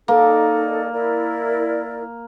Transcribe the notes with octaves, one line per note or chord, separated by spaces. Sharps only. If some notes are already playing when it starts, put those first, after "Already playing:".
A#3 D#4 A4 D5
E4 A#4 D5